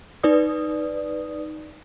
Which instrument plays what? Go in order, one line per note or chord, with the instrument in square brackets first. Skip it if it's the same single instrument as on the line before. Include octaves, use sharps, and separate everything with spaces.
[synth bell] D#4 B4 D5 D#6